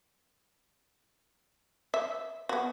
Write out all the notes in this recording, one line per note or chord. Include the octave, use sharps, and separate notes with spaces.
E5
B3 F#4